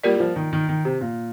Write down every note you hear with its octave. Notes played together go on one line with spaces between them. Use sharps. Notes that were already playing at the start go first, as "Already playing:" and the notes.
G3 A#3 F4 A#4 D5
G3
F3
D#3
D#3
D#3
C3
A#2